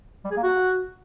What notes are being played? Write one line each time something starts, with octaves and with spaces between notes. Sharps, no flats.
G3
G#4
A#3
F#4